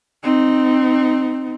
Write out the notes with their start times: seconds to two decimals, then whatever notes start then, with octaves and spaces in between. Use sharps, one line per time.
0.24 C4 D#4